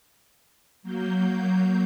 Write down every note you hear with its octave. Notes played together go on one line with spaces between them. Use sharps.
F#3 A#3 G6